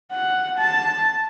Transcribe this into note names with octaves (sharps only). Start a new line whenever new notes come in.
F#5
A5